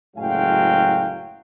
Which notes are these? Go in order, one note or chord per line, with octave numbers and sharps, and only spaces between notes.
F#1 A2 F#3 G#3 F5 G5